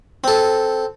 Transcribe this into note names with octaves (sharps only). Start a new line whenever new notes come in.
C4 A4